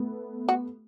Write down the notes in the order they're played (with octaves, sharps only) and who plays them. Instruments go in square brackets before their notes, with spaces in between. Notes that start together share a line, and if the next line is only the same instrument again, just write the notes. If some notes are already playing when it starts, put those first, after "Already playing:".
Already playing: [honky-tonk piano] A3 B3
[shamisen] F#4